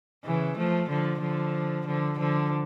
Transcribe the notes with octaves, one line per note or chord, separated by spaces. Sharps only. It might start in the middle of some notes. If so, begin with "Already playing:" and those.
C#3 E3
F3 A3
D3 F3
D3 F3
D3 F3
D3 F3